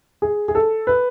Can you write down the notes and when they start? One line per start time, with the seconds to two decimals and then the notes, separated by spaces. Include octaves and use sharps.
0.22 G#4
0.48 G#4
0.55 A4
0.87 B4